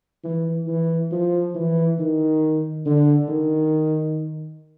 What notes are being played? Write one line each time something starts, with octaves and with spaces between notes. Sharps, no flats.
E3
E3
F3
E3
D#3
D3
D#3